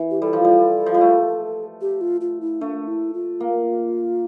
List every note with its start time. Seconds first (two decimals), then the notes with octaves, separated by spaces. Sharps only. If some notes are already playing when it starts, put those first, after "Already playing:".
Already playing: E3
0.11 G4
0.22 G3 A4
0.33 F3
0.44 G3
0.86 F3
0.94 G3
1.01 A3
1.81 G4
2.01 F4
2.21 F4
2.41 E4
2.61 A3 D4
2.87 E4
3.14 F4
3.40 A#3